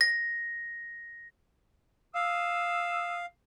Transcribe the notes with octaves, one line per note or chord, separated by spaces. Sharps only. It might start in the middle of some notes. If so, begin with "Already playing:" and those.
A#6
F5 D#6 E6